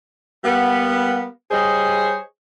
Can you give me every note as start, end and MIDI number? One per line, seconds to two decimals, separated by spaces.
0.44 1.25 55
0.44 1.25 58
0.44 1.25 59
1.51 2.17 55
1.51 2.17 68
1.51 2.17 72
1.51 2.17 73
1.51 2.17 75